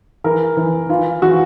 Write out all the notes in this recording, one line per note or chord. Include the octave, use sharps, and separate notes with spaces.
E3 A#4
E3
E3 F4
E3 F#4